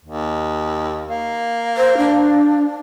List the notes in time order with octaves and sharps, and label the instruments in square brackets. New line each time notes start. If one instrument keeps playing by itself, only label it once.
[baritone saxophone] D#2
A#3
[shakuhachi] C5
D4